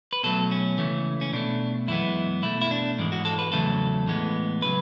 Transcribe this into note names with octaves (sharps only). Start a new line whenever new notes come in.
B4
B2 F#3 A3 A4
C#4
C#2 C#3 E3 A3
C#4
B2 A3 D4
F#2 E3 G#3 B3 E4
B2 A3 E4
E4
D4
G#2 E3 G#3
F#4
A4
B4
E2 C#3 F#3 A3 A4
A2 E3 G#3 B3
C#3 F#3 B4